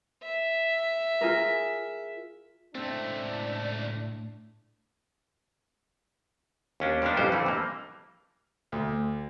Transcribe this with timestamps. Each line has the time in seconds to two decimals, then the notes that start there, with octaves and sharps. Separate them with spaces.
0.23 E5
1.21 F4 G#4 A#4
2.75 C#2 A2 A3 C4 D4
6.80 D#2 C#4 D4
7.02 F2 F3 A#3 B3 D4
7.17 A1 F2 C#3 G3 C#4 C5
7.32 F2 D3 E3 A3
7.46 E3 G3 A#3
8.72 D2